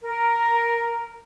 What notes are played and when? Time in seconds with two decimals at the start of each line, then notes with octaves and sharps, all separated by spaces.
0.01 A#4